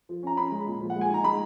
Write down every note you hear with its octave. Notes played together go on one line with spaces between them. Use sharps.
F3
C#4 A#5
C#4 B5
G#3
A#2
F3
F#5
G#3
G#5
D#4 A#5
G#3 B5